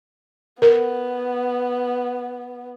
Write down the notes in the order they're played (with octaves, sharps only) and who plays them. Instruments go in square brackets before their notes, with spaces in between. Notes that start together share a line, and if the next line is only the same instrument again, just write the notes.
[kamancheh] B3 [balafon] A#4